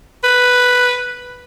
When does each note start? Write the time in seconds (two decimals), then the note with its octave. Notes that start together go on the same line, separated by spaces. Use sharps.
0.24 B4